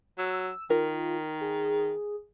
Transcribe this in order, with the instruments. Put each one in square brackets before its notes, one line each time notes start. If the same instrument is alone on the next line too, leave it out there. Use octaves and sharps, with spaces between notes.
[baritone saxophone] F#3 [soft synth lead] E6
[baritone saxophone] D#3 [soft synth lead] F4 [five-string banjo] A#4
[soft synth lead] G#4